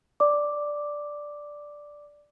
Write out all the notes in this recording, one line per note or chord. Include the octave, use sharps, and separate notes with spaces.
D5 D6